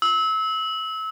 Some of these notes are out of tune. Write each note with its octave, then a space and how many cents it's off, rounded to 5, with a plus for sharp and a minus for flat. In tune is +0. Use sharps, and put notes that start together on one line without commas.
E6 -25